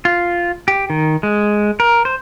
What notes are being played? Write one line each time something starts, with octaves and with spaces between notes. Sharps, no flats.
F4
G4
D#3
G#3
A#4
C5